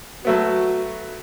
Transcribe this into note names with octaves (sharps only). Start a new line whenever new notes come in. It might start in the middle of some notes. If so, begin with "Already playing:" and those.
F#3 A3 B3 F#4